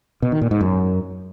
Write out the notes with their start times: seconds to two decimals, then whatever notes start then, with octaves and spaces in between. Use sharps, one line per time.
0.22 B2
0.32 D#3
0.42 A#2
0.51 G#2
0.61 F#2